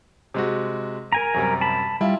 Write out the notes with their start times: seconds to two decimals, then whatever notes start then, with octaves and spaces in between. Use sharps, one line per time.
0.34 C3 G#3 F#4
1.12 A#4 G#5 A#5
1.34 F#2 C3 G3
1.61 A5 B5
2.01 G3 E4 F4